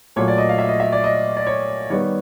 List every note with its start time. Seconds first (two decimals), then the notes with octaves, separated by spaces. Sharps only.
0.16 A#2 F#3 A3 C#5
0.28 D5
0.38 D#5
0.49 F5
0.58 E5
0.69 D#5
0.80 E5
0.92 D5
1.04 D#5
1.37 D5
1.47 C#5
1.90 D#3 G3 B3 C#5